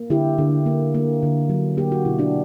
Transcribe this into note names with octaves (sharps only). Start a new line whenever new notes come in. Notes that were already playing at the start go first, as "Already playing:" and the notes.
Already playing: A#3
D3 E4 G4
D3
A#3
A#3
D3
F#3
A#3 G4
F#4
B2 E4
D4 F#4